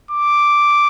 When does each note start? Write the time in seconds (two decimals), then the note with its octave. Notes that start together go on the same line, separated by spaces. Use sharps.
0.11 D6